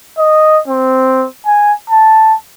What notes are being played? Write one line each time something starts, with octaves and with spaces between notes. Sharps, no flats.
D#5
C4
G#5
A5